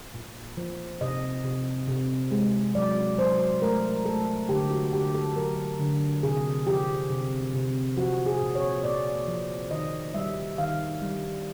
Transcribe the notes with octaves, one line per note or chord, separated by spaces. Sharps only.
A#2
F3
C3 D#5
C3
C3
G#3
F#3 D5
F#3 C5
A3 A#4
A3 A4
D3 G4
F#4
D3 G4
A4
F#3 A#4
D3
C3 G#4
F3 G4
C3
C3
F3 F#4
G#4
A#2
C#5
A#2 D5
F3
D#3 D#5
G3 E5
D#3 F5
G3